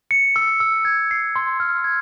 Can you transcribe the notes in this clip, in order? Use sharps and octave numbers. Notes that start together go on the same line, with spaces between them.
C#7
E6
E6
G#6
C7
C6
F6
G#6